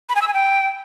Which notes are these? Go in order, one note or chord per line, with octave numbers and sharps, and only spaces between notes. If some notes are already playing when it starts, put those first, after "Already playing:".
B5
G#5
E6
G#5
G5